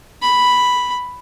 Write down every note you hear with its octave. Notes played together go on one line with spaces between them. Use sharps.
B5